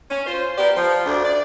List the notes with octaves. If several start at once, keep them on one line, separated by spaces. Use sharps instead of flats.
C#4
F4 C5
B3 G4 A#4 D5
F3
D2 D4
D5